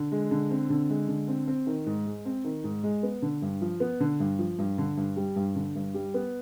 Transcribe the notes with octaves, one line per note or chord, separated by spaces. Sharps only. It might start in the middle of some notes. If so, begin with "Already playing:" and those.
Already playing: D3
G#3
D3
C4
D3
G#3
D3
C4
C4
D#3
G#2
G#3
C4
D#3
G#2
G#3
B3
D3
G2
F3
B3
D3
G2
F3
G2
D3
G2
G3
G2
D3
G2
G3
B3